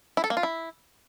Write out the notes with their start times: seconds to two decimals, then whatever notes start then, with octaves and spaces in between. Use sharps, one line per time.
0.17 E4
0.24 A4
0.30 A#3
0.37 F4
0.43 E4